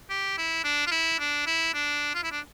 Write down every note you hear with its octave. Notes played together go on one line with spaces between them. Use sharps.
G4
E4
D4
F4
E4
D4
E4
D4
F4
E4
D4